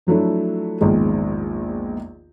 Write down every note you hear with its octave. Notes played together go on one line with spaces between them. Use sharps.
F3 F#3 A3 D4 E4
A#1 E2 G#2 D#3 G#3